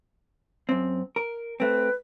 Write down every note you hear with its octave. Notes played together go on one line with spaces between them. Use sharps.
F#2 C4
A#4
A3 C4 B4